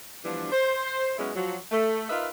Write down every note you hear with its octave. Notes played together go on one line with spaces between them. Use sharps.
E3 F3 G3 B3 D4
C5
F#3 G#3 B3 C#4 E4
F3 F#3
A3
D#4 F4 A#4 B4 D#5 E5